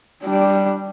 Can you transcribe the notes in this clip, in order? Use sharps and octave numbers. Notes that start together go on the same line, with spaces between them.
G3 D4